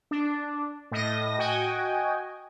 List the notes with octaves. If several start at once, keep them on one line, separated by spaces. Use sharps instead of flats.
D4
A2 D#5 A#6
F#4 D#5 G5 G#5